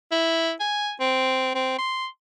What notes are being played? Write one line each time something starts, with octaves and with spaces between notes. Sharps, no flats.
E4
G#5
C4
C4
C6